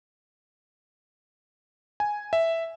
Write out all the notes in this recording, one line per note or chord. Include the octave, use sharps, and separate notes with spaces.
G#5
E5